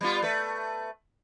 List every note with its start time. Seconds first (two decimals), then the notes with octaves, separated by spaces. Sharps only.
0.01 G3 B3 F4
0.22 A3 B4